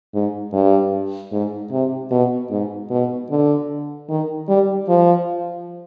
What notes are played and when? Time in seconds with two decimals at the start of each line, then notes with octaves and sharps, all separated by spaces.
0.14 G#2
0.53 G2
1.32 G#2
1.71 C3
2.11 B2
2.51 G#2
2.90 B2
3.30 D3
4.09 D#3
4.49 G3
4.88 F3